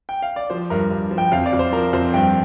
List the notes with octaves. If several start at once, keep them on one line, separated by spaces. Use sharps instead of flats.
G5
F5
D5
F3 C5
G2 A#4
G2
F3
G5
F2 F5
D5
F2
C5
F3 A#4
F2 C5
G2 G5